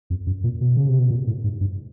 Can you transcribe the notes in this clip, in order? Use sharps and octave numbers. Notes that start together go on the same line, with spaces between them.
F2
F#2
A#2
B2
C#3
C3
B2
A#2
A2
G#2
G2